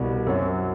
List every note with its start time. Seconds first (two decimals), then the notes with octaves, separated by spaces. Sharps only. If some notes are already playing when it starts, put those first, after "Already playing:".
Already playing: C2 B2 G3
0.27 F#2 F#3 C4